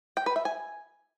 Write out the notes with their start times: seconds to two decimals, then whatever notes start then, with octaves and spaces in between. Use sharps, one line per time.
0.17 G5
0.26 B4
0.36 E5
0.45 G#5